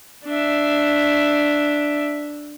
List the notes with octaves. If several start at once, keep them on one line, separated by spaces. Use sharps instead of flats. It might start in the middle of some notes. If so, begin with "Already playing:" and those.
D4 E5